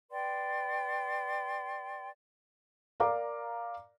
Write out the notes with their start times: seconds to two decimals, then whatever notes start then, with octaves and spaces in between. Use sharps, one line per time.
0.11 B4 D5 G5 C6
3.00 A#4 D5 F5 A#5 D6